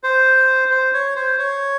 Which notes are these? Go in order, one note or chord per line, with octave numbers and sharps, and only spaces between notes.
C5
C5
C#5
C5
C#5